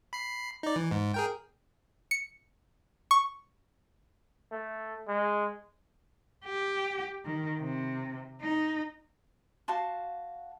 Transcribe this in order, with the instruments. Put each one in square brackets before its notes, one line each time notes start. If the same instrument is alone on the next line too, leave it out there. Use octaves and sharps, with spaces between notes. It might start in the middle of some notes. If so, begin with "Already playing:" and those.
[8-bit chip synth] B5 C7
D#4 D5
E3
G#2
G#4 A#4 G5
[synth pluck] C#7
C#6
[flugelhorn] A3
G#3
[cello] G4
D#3
C3
D#4
[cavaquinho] F#4 F5 A5 C6